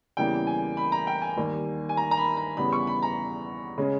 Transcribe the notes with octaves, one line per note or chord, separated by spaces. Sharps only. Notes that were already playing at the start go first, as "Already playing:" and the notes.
E2 C#3 E3 G3 A#3 G5
G#5
B5
A#5
G5
G#5
D#2 D#3 G3 A#3
G#5
A#5
A#5
B5
A#5
E2 C#3 G3 B3 B5
C#6
B5
A#5
C#3 G#3 C#4